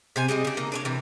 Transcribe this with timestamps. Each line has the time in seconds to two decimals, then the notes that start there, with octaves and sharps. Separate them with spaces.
0.16 C3 C4 G#5
0.28 G3 G#3 C4 D#5
0.45 C#3 D4
0.57 A#3 D#4
0.72 D4 B4 C#5
0.85 C3 E3